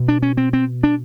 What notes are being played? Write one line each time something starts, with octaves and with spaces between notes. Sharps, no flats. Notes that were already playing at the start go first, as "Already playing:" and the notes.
Already playing: B2
D4
C#4
C4
C4
D4